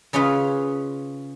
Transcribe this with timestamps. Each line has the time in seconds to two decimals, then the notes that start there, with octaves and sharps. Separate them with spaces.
0.13 C#3 C#4 F4 G#4 B4